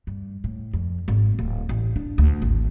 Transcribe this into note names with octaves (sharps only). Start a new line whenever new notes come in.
G2
A2
F2
G#1
D1
A1
D4
D2
G#1